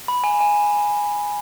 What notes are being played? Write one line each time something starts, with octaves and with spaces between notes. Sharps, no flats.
B5
G#5
G#5